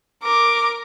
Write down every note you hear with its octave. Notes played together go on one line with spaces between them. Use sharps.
A#4 D6